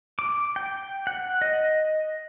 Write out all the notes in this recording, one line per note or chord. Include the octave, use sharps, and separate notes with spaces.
D6
G5
F#5
D#5